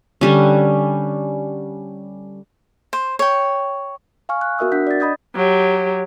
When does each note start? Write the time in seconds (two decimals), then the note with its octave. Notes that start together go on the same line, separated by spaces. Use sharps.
0.21 D3 G3 C#4
2.93 C5
3.19 C#5 G5
4.29 F5 G#5 C#6 F6
4.41 F#6
4.59 B3 F#4 A#4 E5 D#6 E6
4.72 D4 F#5 G6 B6
4.87 D5 A6
5.00 D#5 B5 D#6 G6 G#6
5.35 F#3 G4